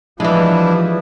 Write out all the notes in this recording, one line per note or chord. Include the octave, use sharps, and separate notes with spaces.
E3 F3 G3 G#3 D4 E4